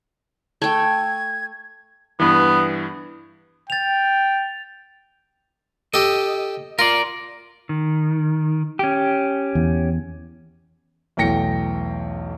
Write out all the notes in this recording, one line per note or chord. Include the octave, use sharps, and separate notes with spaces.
A3 G5 G#6
G2 E3 B3
G5 A6 F7
G4 A4 D#5
F4 A#4 D5
D#3
C#4 G4
E2
B1 E2 A3 G5 A#6 C#7